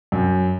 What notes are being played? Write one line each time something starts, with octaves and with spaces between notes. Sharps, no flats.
F#2